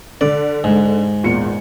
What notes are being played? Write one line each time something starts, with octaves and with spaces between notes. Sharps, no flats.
D3 D5
G#2
E2 A#2 C#7